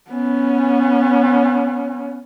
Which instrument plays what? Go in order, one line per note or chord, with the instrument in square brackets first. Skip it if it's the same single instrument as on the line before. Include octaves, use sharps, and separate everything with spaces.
[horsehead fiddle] B3 C#4